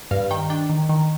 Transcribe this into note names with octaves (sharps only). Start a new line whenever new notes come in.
G2 F5
D#3 G5
D4 G5
D#3
D#3